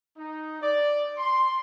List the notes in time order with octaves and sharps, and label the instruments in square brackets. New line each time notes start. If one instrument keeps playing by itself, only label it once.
[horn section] D#4
D5
C6